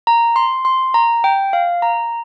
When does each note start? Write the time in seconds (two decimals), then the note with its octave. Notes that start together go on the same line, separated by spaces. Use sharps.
0.07 A#5
0.36 C6
0.65 C6
0.94 A#5
1.24 G5
1.53 F5
1.82 A#5